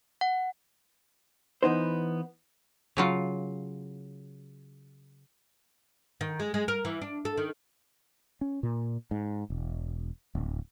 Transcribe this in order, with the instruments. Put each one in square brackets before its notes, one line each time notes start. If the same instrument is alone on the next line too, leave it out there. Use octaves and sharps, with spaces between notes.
[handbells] F#5
[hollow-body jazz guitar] E3 B3 D#4 C5
[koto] C#3 F#3 F4
[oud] D#3
G#3
G#3
A#4
E3
D4
A4
D#3
[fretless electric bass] C#4
A#2
G#2
E1
D1